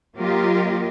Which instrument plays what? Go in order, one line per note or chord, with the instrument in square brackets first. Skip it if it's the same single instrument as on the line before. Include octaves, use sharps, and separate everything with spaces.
[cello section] F#3 A#3 F4 G4 A#4 D#5